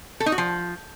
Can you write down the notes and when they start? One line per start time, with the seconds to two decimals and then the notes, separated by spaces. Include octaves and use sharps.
0.20 A4
0.26 D#4
0.32 F#4
0.38 F3